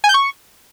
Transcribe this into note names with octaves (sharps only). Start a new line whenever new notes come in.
G#5
G6
C#6